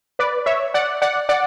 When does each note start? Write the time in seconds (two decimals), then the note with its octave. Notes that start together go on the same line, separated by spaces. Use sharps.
0.19 B4 D5
0.46 C#5 E5
0.74 D5 F#5
1.02 D5 F#5
1.29 D5 F#5